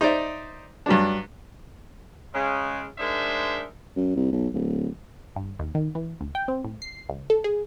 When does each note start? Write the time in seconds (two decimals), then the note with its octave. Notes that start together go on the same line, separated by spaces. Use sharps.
0.01 D#4 C5 D5 E5
0.86 G2 F#3 D4
2.33 C#3 G#3
2.98 G#3 D4 D#4 A#4 C5 E5
3.97 F#2
4.16 C2
4.33 B1
4.54 D1
5.36 G2
5.59 D#2
5.75 D#3
5.95 E3
6.21 D2
6.35 G5
6.48 C4
6.64 A2
6.82 C7
7.09 C#2
7.30 A4
7.44 G#4